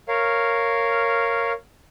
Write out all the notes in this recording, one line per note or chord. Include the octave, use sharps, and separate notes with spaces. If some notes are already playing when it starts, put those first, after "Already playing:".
A#4 C#5 F5